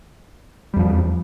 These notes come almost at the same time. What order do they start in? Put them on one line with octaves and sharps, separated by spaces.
G3 E2 F3